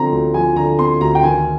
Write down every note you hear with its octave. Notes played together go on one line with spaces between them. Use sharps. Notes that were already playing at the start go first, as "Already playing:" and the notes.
Already playing: D3 F3 C4 A#5
D2
F3 G#5
D3 A#5
C4 C6
D2 A#5
G5
D#3 G#5